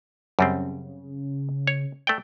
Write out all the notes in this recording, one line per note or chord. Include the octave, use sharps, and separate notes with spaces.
F#2 C#3 G3 C4
C#5
A3 D5 G5